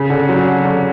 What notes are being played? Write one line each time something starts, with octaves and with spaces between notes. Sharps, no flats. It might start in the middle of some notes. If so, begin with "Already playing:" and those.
Already playing: C#3
D3
F#3
D3